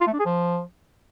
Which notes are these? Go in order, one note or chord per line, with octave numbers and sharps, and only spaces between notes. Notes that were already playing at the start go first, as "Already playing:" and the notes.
F4
A3
D4
G#4
F3